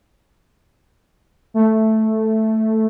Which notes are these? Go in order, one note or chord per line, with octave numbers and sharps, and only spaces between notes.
A3